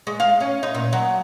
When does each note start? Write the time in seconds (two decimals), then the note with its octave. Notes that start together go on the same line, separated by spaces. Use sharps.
0.07 G#3
0.20 F5
0.40 C#4
0.63 D#4
0.74 A#2
0.93 F#3